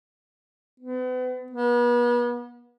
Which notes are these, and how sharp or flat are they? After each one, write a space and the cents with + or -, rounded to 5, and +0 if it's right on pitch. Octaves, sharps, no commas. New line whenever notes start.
B3 +40
B3 -40